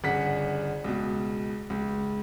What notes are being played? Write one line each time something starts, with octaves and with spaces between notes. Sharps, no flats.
G1 C#3 F#5 B6
C#2 B2
C#2